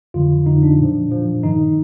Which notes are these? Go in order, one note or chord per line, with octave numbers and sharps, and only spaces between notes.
F2 D3 F3 F4
F2 D3 F3 D#4
D4
A#2 F3
A#2 F3
G2 D#3 D#4